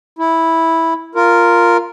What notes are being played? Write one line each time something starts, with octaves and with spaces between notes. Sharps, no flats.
E4
F4 A#4